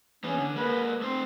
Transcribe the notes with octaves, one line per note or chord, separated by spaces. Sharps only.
E3 B3 C#4
D3
G#3 A#3 B4
A3 C4 C5